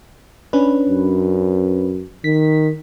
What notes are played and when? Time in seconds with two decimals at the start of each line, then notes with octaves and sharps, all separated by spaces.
0.53 C#4 D4 B4
0.89 F#2
2.24 D#3 B6